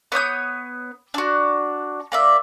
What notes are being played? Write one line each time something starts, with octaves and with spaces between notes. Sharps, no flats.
B3 C#5 D#6 G6
D4 F#4
A#3 D5 E5